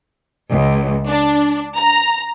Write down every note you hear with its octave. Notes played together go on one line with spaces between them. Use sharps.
C#2
D4
A#5